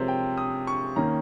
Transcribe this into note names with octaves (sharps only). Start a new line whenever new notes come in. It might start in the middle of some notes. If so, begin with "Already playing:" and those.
Already playing: C3 F3 G#3 A#4 C5 C#5
G5
D#6
C#6
D#3 A#3 C#4 A#5